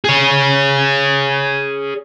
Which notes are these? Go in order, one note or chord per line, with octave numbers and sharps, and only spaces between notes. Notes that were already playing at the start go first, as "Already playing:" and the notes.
G#4 C#5